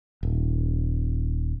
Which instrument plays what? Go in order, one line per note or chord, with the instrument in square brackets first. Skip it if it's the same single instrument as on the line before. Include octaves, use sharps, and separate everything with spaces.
[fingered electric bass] D#1